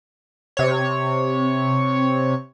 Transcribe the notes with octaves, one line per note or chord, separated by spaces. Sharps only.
C3 C#5